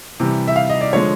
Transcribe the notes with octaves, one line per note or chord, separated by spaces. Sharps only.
C3 E3 G3
E5
F5
D#5
D5
D3 F3 G#3 C#5